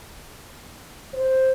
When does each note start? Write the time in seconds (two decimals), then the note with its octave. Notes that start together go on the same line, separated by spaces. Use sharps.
1.14 C5